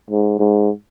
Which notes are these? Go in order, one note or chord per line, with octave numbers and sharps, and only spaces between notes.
G#2
G#2